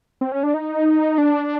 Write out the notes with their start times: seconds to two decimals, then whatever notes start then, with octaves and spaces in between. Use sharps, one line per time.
0.21 C4
0.32 C#4
0.43 D4
0.54 D#4
1.18 D4